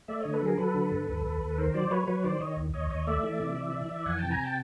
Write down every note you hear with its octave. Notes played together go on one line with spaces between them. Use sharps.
A3 D5 E5
D3 C#5 D#5
A4 B4
F#3 G#4 A#4
F#3 A4 B4
D3
G2
D#2
D#2
D#2
D#3 A#4 C5
F#3 C5 D5
F#3 B4 C#5
F#3 B4 C#5
D#3 C5 D5
D#3 C#5 D#5
D#2
D#2 C#5 D#5
D#2 C#5 D#5
A3 D5 E5
E3
C3
E3
E3
E3
F2 F#5 G#5
C3 G5 A5
G#5 A#5
G5 A5